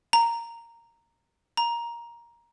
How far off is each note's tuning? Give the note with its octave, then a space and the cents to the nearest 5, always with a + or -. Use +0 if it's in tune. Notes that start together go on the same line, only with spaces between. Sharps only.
A#5 -10
A#5 +10